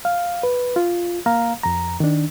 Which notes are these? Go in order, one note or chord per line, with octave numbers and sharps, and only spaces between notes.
F5
B4
F4
A#3 F5 A#5
F2 A#5
D#3 D4